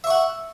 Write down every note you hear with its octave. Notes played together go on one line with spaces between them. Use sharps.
E5 F#5 C#6